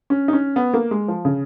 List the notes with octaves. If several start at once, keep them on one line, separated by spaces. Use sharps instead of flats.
C#4
D#4
C#4
B3
A#3
G#3
F3
C#3